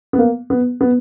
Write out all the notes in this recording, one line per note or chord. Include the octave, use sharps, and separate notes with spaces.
B3
A#3
B3
B3